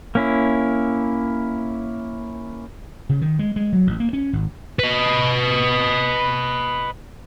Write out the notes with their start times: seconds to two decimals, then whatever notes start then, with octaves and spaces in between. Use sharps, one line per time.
0.15 A#3 C#4 E4
3.09 C#3
3.22 D#3
3.39 G#3
3.56 G#3
3.73 F#3
3.87 A1
4.00 A#3
4.13 C#4
4.33 G#1
4.79 B4 D#5